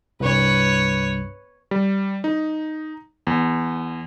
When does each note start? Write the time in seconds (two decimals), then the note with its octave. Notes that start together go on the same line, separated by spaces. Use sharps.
0.20 C2 G2 B4 C#5
1.71 G3
2.24 D#4
3.27 E2